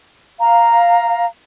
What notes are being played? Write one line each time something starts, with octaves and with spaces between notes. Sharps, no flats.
F5 A#5